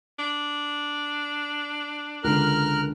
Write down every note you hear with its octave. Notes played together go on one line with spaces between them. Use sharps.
D4
C#2 D3 A#4 F6 F#6